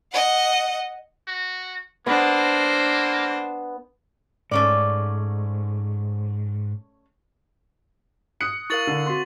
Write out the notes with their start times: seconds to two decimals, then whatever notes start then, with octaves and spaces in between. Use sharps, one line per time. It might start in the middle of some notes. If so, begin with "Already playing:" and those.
0.13 D#5 F#5
1.27 F#4
2.07 A#3 B3 D4 C5
4.51 G#2 A3 C#4 D5
8.40 D#6 F#6 C#7
8.70 E4 A#4 F5 C#6 A6 F#7
8.87 D3
9.06 C4 F#4 C6